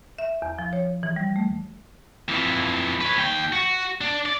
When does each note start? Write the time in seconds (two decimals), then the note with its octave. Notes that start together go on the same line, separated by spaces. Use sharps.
0.18 E5
0.42 E2
0.59 F3
0.73 C#5
1.03 E3
1.16 G3
1.36 A3
2.28 F2 E3
3.01 B4 C#5
3.18 D#2 G5
3.53 F#4
4.01 D4
4.26 D5